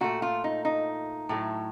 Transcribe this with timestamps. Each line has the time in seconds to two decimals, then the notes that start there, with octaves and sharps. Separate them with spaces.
0.01 A#2 A3 F#4
0.22 F4
0.44 D#4
0.65 D#4
1.29 A2 F#3 A3